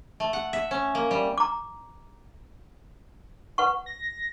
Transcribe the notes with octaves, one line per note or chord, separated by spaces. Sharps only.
A3
F#5
E5
C#4
A#3
G3
A#5 D6
B4 F#5 C#6
A#6